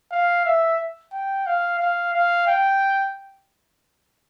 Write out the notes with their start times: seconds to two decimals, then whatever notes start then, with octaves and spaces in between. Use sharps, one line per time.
0.11 F5
0.45 E5
1.13 G5
1.46 F5
1.80 F5
2.14 F5
2.47 G5